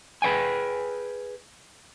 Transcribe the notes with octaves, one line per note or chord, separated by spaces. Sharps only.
G#4 B4 C#5 G5 G#5